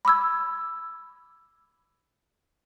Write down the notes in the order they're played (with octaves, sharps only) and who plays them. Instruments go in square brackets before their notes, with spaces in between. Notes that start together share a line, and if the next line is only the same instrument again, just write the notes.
[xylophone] B5 D6 E6 G#6